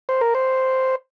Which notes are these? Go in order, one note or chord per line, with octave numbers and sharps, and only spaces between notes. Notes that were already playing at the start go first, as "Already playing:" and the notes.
C5
A#4
C5